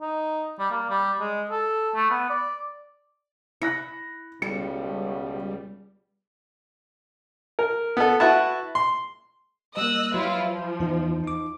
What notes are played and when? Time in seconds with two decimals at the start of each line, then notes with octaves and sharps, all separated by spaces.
0.01 D#4
0.59 G3
0.71 A#3
0.90 G3
1.20 G#3
1.51 A4
1.95 A3
2.10 B3
2.29 D5
3.62 E4 F#6 A#6 C#7
4.42 C#2 B2 G3 A4 C#7
7.59 A#4
7.97 B3 A4
8.20 E4 F#4 B4 E5 A5
8.75 C6
9.77 G3 A#3 D#5 E6 F#6
10.13 F#3 G3 E4 F4 B4
10.43 F3
10.80 E2 E3 D#4
11.24 D#4 D6